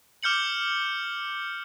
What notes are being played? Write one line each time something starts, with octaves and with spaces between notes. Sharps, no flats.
D6 F6 G6 C#7 F#7